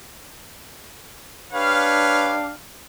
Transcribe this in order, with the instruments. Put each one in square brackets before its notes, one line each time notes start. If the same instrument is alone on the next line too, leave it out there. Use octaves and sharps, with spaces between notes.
[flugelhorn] D4 [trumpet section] G4 F5 [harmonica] B4 C#5